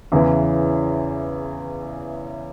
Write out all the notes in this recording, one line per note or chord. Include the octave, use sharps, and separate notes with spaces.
E2 C#3 E3